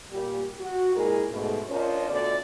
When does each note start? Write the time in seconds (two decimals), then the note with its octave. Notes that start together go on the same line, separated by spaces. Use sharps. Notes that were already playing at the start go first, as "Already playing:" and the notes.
0.11 A#2 G3 G4
0.59 F#4
0.95 G2 A#2 G#3 E4 G#4 A#4
1.29 G#2 B2 A3
1.69 C#4 D4 F4 A#4 C5 D#5
2.09 D2 B2 D3 F4 D5